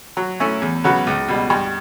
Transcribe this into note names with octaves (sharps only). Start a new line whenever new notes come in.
F#3
A3 C#4 E4
E2
C#3 F#3 B3 F#4
C#2
B2 G3
G2